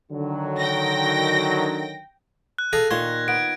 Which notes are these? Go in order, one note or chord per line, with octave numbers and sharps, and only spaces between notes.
D3 D#3 F#3
G5 A#6
F#6
G#4 A4 F5 A#6
A#2 D#3 C#5 C6 G#6
B3 D7